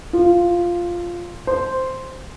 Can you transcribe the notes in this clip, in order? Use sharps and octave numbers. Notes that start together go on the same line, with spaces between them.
F4
C5